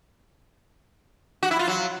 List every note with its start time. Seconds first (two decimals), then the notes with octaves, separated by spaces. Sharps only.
1.43 F#4
1.51 E4
1.59 F4
1.67 F#3